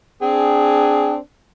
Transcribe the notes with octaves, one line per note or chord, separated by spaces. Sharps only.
C4 D4 G#4